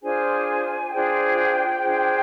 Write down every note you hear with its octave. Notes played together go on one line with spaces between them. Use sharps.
D4 F4 G#4 C5 G#5
D4 F4 G#4 C5 G5
D4 F4 G#4 C5